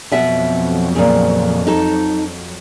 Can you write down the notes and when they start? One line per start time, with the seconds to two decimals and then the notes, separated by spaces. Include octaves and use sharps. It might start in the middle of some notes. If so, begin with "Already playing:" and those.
0.11 F2 B2 F#3 E5 F#5
0.95 A#2 C#3
1.67 D#4 A4